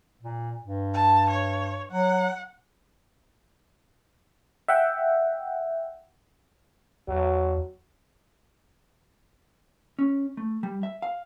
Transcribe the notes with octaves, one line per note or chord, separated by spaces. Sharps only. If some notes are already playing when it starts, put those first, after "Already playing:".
A#2
G2
A5
C#5
F#3 F#5
E5 F#5 G5
E2 F#3
C#4
A3
G3
E5
F5